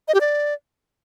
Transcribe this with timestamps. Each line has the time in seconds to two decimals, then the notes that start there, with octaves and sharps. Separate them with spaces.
0.08 D#5
0.14 G4
0.21 D5